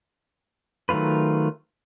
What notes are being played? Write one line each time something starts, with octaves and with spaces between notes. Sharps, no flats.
D#3 F#3 A3 F4 B4